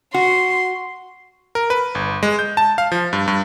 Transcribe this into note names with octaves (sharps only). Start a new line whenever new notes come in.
F#4 C6
A#4
B4
G1
G#3
G6
A5
F5
F3
G2
G2